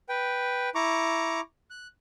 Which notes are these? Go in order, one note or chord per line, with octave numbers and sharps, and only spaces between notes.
B4 G5
E4 A#5 C#6 D6
F#6